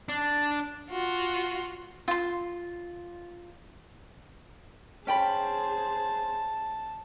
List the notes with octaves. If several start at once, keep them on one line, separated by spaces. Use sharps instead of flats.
D4
F4 F#4
F4 C6
C#4 G#4 C5 G5 A5 B5